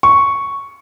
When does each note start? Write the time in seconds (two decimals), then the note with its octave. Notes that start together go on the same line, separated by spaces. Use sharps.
0.03 C#6